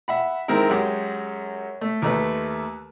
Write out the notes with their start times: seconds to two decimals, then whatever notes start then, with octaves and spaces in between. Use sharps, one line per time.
0.08 E5 F#5 B5
0.48 D#3 G#3 C4 E4 A#4
0.69 F#2 G#3 G4 F#5
1.81 A3
2.02 D#2 A3 B4